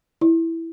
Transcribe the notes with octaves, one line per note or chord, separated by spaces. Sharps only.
E4